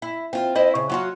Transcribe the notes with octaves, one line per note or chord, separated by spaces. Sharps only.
E4
C4 F4
E4 C5 D#5
C#3
F#3 F4 F#4